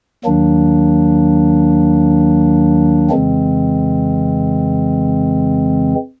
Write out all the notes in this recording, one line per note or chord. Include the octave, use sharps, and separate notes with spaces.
D#2 D#3 F#3 A#3 D4
F2 C#3 E3 G#3 C4